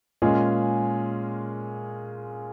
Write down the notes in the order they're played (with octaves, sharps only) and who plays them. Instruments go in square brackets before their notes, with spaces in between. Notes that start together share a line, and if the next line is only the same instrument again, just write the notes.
[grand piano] A#2 G#3 C#4 F4 G#4